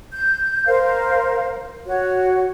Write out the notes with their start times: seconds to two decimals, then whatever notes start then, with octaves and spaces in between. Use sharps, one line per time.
0.12 G6
0.67 A#4 C5 F5
1.86 F#4 C#5